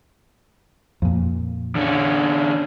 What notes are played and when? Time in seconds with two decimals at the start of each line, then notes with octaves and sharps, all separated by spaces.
1.02 F2 A#2
1.75 D3 C#4